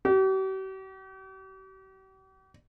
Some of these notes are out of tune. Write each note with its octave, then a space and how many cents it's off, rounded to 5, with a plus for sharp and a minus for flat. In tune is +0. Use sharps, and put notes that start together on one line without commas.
G4 -45